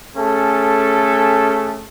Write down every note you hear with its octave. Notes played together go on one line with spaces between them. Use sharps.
A3 C#4 G#4 A4